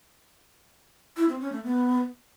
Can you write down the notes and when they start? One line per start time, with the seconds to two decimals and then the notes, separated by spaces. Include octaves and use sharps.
1.17 E4
1.29 C4
1.40 C#4
1.52 A3
1.64 B3